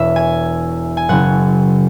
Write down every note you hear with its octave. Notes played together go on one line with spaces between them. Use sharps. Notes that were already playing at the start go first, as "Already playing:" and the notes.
Already playing: E1 E2 B2 C#5 E5
G#5
G#5
F#1 F#2 C#3 F#5